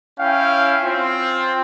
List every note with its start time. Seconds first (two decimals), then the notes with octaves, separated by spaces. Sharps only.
0.20 C#4 E4 F5 G5
0.83 C4 F4